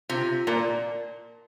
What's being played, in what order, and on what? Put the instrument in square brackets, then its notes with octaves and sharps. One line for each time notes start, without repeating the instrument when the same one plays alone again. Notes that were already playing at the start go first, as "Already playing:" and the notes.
[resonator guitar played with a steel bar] C3 [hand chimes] F4
[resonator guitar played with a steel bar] A#2 [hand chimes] A#4 D5 A5